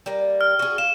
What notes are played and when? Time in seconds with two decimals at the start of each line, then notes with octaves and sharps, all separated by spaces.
0.06 G3 A#3
0.41 F6
0.59 F#4 G#4
0.78 F5 E7